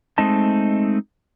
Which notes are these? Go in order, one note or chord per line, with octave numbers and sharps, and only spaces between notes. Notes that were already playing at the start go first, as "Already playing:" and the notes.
G#3 A3 C4 D#4 D#5 A5